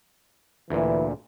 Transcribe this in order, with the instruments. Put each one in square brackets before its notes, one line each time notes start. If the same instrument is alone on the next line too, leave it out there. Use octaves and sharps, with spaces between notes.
[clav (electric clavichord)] D2 A#2 [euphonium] E3